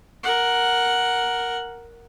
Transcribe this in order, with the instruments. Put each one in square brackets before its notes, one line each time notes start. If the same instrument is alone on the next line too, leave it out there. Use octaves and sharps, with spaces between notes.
[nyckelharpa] A#4 F#5